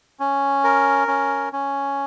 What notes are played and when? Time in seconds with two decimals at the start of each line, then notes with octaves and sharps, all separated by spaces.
0.20 C#4
0.64 A#4
1.08 C#4
1.53 C#4